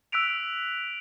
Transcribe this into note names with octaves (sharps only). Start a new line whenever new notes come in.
E6 F#6 B6 D7 F7